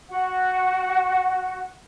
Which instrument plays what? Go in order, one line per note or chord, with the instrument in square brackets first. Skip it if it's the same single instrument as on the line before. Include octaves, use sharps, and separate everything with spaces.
[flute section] F#4 F#5